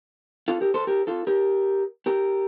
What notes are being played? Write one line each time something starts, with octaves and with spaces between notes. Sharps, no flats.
F4 A4
G4 A#4
A4 C5
G4 A#4
F4 A4
G4 A#4
G4 A#4